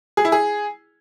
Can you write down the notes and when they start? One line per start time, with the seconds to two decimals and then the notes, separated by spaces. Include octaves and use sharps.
0.17 G#4
0.25 E4
0.32 G#4